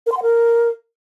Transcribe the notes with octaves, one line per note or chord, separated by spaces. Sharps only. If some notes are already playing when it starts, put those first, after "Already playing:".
A#4
C6
F#5
A#4